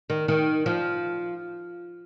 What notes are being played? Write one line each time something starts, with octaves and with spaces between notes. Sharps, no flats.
D#3
D#3
F3